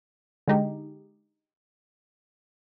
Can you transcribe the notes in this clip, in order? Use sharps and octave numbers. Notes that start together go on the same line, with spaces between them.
D3 G#3 D#4 G4